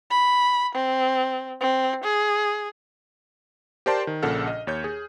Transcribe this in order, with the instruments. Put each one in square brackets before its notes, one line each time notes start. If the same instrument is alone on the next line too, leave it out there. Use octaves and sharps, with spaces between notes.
[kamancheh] B5
C4
C4
G#4
[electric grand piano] G4 A#4 C5 D5 A5 C6
D#3
A#1 A#2 C#3 A4 F#5 F6
D#5
D#2 C#5 G6
G#4